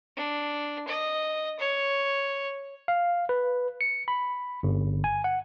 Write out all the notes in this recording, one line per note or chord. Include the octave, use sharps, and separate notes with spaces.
D4
D#5
C#5
F5
B4
C#7
B5
G1
G#5
F#5